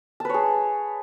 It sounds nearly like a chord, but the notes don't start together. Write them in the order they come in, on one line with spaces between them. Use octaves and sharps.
A5 B4 C#5 G#4